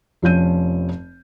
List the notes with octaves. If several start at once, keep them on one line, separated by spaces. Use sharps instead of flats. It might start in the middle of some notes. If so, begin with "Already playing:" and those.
F1 F3 C#4 G6 D#7